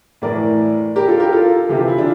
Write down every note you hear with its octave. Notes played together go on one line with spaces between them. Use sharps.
A2 E3 A#4 D5
G4 A#4
F4 A4
G4 A#4
F4 A4
C3 E3 G4
F4
E4
D4 F4